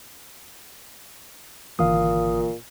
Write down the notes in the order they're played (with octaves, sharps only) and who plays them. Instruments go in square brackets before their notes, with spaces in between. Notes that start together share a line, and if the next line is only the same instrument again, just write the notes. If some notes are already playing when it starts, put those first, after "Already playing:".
[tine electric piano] G#1 F5 D#6 [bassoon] A#2 [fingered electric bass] D3 E3 A#3